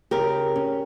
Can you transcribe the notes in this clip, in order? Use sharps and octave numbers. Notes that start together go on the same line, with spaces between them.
C#3 G4 A#4
C#4